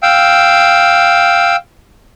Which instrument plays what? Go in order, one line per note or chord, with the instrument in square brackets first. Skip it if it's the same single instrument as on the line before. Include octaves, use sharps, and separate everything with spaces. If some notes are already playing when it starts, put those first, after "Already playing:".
[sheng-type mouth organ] F5 G5 E6